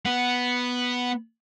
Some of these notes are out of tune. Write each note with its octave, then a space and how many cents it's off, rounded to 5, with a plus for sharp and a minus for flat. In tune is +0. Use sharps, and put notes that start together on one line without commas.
B3 +0 F#5 +0